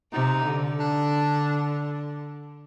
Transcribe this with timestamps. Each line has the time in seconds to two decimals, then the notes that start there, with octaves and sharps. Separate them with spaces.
0.13 C3 D#4
0.46 D3
0.80 D4